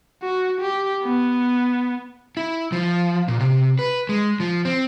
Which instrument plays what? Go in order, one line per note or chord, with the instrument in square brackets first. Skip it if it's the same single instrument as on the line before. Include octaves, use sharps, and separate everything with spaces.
[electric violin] F#4
G4
B3
[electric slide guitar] E4
F3
A#2
C3
B4
G#3
F3
C4